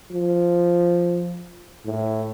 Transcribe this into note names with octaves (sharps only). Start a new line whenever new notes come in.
F3
A2